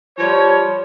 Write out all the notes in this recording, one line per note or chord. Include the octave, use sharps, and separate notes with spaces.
F3 G3 C#5